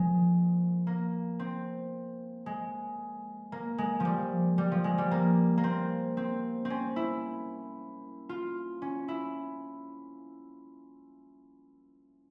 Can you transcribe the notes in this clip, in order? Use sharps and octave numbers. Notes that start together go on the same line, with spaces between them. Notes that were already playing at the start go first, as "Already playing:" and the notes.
Already playing: F3 G#3 A#3
A#3
C4
G#3
A#3
G#3
F3 G3
G3
F3
G#3
G3
A#3
A#3
C4
C4
C4
C#4
E4
F4
C#4
E4